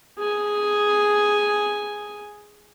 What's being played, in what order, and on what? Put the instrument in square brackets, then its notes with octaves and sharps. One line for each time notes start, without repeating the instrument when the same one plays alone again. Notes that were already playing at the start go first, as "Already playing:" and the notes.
[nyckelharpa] G#4 G#5